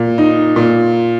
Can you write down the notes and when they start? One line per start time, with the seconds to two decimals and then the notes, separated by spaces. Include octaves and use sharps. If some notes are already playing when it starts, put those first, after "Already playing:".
Already playing: A#2
0.18 D#4
0.56 A#2